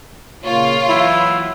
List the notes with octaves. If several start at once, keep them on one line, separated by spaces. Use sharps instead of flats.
A#2 C#3 A#3 F4 C#5
E3 F#3 E4 F5